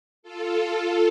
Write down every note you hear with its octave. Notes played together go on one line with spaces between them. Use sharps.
F4 A4